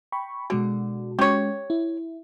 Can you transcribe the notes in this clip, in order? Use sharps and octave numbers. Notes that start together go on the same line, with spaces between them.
G5 B5 C#6
B2 D3 G#3 F#4
G#3 C#4 F#4 G4 C#5
E4